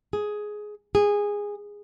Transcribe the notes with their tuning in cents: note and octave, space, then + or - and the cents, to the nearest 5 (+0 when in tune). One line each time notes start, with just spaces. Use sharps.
G#4 +10
G#4 -15